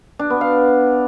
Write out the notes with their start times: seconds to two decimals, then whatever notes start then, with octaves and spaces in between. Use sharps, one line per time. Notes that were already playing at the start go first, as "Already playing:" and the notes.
0.19 D4
0.30 B3
0.41 F5